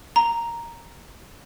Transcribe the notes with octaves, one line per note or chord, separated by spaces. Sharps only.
A#5